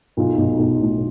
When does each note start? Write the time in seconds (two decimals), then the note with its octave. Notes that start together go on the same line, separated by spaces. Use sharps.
0.17 B1 F4
0.38 B1
0.59 B1
0.80 A2